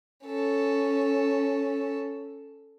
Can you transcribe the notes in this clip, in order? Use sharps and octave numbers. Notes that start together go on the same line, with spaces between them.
C#4 A4